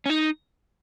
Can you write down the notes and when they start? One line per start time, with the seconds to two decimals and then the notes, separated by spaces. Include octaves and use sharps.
0.06 C#4
0.10 D#4